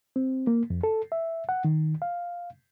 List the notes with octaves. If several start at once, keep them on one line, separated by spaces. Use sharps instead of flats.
C4
A#3
F2
A4
E5
F#5
D#3
F5